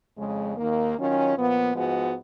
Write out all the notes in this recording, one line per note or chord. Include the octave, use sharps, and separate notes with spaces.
F2 C#3 G#3
D#2 D#3 A#3
D#3 F#3 C#4 F4
A#2 F3 B3
G#2 F3 G#3 B3 F#4